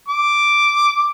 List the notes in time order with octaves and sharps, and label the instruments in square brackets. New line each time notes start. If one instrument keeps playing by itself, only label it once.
[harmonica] D6